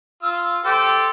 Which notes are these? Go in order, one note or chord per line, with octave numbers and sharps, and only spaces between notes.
F4 E6
G4 A4 C5